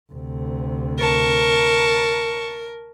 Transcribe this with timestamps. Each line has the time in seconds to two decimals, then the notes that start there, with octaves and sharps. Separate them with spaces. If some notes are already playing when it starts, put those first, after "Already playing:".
0.12 D2 C3
0.99 A#4 A5 C#6